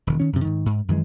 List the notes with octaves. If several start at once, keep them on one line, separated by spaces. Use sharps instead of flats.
E1 D#3
D#3 C#4
F#2 C3
G#2 D#3
G#2
F#2 D#3 E3 G#3